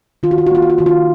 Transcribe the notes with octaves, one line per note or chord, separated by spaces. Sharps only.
D#3 F4
F#4
F4
F#4
A#3 F4
F#4
F4
D#3 F#4
F4